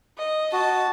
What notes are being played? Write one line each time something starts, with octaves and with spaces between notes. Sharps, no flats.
D#5
F#4 A5